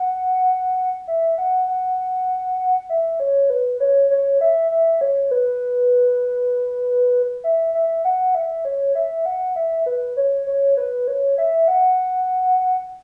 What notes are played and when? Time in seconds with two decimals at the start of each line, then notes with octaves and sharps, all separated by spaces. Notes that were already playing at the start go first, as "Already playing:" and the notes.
Already playing: F#5
1.08 E5
1.38 F#5
1.68 F#5
2.89 E5
3.20 C#5
3.50 B4
3.80 C#5
4.10 C#5
4.41 E5
4.71 E5
5.01 C#5
5.31 B4
7.44 E5
7.74 E5
8.05 F#5
8.35 E5
8.65 C#5
8.95 E5
9.26 F#5
9.56 E5
9.86 B4
10.17 C#5
10.47 C#5
10.77 B4
11.07 C#5
11.38 E5
11.68 F#5